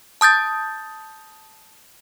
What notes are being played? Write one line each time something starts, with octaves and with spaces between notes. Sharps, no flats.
A5 D#6 G6 A6